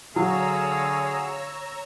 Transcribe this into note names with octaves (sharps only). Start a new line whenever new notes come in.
D3 F#3 G#4 C#5 F5 A#5 E6